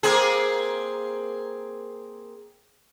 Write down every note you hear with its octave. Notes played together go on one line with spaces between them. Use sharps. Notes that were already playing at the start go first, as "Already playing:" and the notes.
A#3 C4 G#4